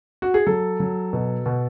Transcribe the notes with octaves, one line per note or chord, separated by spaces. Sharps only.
F#4
G#4
F#3 A4
F#3
B2
B2